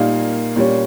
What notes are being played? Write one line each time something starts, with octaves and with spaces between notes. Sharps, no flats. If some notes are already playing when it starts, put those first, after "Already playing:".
Already playing: A#2 G3 A#3 D#4 F5
A#2 G3 C#4